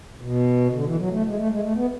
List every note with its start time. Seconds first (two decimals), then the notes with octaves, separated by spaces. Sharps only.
0.21 B2
0.73 D3
0.85 E3
0.97 F#3
1.11 A3
1.26 G#3
1.37 A3
1.49 G#3
1.62 A3
1.75 B3